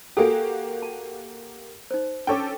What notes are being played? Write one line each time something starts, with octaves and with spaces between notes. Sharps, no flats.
A#3 F#4 G4 A4 G#5
A5
D#4 C5
C#4 D4 A4 G5 C#6 D6